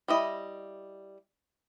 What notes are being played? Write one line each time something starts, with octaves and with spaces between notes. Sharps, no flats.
G3 E4 D#5